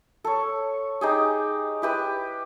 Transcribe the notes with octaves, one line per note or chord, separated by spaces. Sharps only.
A4 C#5
D#4 G4 G#4
E4 G4 B4